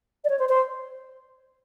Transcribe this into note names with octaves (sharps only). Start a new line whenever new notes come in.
D5
C#5
C5
C5